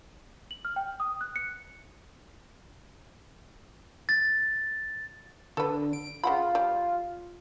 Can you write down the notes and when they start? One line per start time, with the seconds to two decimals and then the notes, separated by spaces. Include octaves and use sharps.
0.51 F#7
0.65 F6
0.76 G5
1.00 D#6
1.21 F#6
1.36 C#7
4.09 A6
5.57 D3 A4 B4
5.93 D7
6.23 C#3 F4 F#5 B5
6.55 G3